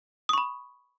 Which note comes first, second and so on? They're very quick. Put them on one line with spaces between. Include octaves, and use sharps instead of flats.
D#6 C#6 B5